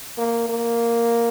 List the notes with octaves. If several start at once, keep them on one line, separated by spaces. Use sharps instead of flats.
A#3
A#3